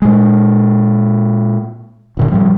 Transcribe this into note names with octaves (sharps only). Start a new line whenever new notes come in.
A#2 G#3
D#1 A#2 D3
A2 F3 G3